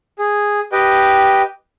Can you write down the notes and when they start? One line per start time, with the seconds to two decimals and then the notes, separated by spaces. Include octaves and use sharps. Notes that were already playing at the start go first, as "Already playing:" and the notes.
0.19 G#4
0.72 G4 B4 D#5 G5